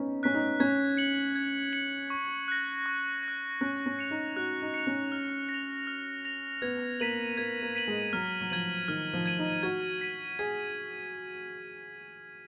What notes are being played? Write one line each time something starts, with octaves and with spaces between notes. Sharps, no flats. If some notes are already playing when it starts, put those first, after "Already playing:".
Already playing: B3 C#4 D#4
C#4 F#6 B6
D#4
C#4 G#6
C#7 F#7
G#6
C#7 F#7
C#6
F#6 A#6
C#6
F#6 A#6
C#4 F#6
C#4
C#7 F7
D#4
F#4 F#6
D#4
C#7 F7
C#4
F6
A#6
F7
F6
A#6 F7
B3 G#6
A#3 B6 D#7 F#7
A#3 G#6
A#3
B6 D#7 F#7
G#3
F#3 F6
F#3
F3 G#6 D#7 F#7
D#3 F6
F3
G#6 D#7 F#7
D#4
F#4 G#6
B6 D#7
G#4 G#6